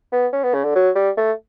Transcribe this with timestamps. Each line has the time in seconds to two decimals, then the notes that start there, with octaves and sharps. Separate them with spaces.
0.12 B3
0.33 C#4
0.43 B3
0.54 C#3
0.64 D3
0.75 F#3
0.95 G3
1.17 A3